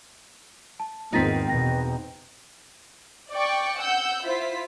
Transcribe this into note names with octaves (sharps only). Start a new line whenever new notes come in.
A5
E2 G#2 D#3 C4 D#4 F4 A6 B6
E2 B2 G5 A#6
D5 G5 C#6
F#5 E6 G6
E4 F4 C5 B6